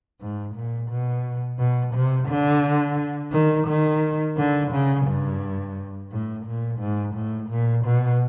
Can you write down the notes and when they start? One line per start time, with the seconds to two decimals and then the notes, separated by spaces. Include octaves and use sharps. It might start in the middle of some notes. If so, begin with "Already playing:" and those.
0.21 G#2
0.56 A#2
0.90 B2
1.59 B2
1.94 C3
2.29 D3
3.33 D#3
3.68 D#3
4.38 D3
4.72 C#3
5.07 G2
6.11 A2
6.46 A#2
6.80 G#2
7.15 A2
7.50 A#2
7.86 B2